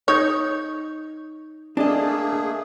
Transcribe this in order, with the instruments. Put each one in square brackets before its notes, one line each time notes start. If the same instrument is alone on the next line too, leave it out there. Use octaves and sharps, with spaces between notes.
[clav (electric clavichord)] D#4 [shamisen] C#5
[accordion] A3 A#3 G#4 [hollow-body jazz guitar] D4 D#5